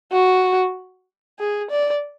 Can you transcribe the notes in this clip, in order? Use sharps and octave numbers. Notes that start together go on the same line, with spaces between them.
F#4
G#4
D5